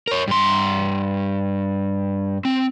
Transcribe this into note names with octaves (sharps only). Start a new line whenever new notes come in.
A#4 C#5
G2 C6
C4